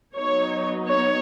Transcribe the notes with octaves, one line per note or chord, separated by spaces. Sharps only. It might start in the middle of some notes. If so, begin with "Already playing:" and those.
F#3 B3 D#4 C#5
C#5